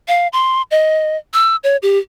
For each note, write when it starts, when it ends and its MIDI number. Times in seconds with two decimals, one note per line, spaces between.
0.08 0.28 77
0.33 0.62 84
0.71 1.17 75
1.34 1.56 88
1.64 1.77 73
1.83 1.99 67